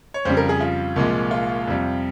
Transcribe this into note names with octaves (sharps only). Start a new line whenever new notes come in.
C#5
F2 C#3 G3 C5
A#4
G#4
F4
C2 A#2 F3 G#3
F4
F2 C3 G3